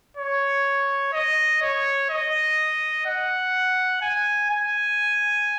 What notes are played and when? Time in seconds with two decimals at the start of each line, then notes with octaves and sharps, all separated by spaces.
0.17 C#5
1.13 D#5
1.62 C#5
2.10 D#5
3.06 F#5
4.02 G#5
4.51 G#5